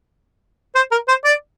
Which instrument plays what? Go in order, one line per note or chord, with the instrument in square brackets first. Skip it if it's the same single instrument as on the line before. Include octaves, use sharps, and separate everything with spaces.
[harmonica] C5
A#4
C5
D5